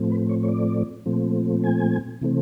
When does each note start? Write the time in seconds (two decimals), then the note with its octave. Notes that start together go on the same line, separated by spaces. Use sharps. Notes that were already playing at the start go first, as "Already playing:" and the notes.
Already playing: A2 F3 A3 C4
0.10 B4
0.29 C#5
0.43 C#5
0.48 D5
1.06 A#2 F3 A3 C4
1.64 G#5
2.21 C3 E3 A3 C4